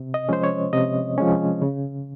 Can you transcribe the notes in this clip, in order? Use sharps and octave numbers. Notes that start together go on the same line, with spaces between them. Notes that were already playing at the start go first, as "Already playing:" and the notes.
Already playing: C3
D#5
F3 G#3 C#4 C5
C#5
C3 D#5
F3 G#3 C#4
C#3